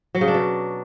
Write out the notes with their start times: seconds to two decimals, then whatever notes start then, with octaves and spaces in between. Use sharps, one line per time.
0.15 F#3
0.21 C#3
0.28 D4
0.34 B2